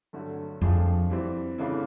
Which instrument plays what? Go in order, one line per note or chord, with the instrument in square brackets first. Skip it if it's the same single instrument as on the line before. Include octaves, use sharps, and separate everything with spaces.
[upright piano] G2 D3 F#3 A3
[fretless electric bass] F2 [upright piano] F3 A3 D4 F4 G#4
[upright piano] E3 G3 C4
C#3 E3 A3 D4 F4